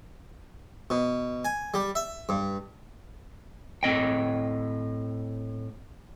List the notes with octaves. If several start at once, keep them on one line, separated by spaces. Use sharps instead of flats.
B2
G#5
G3
E5
G2
A2 C4 D#5 G5